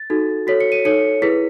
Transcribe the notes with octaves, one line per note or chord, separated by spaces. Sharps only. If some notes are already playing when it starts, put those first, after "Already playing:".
Already playing: A6
D#4 F#4 A4
F#4 A4 C#5 B6
C#7
D#7
D#4 A4 C#5 C#7
E4 G#4 B4 B6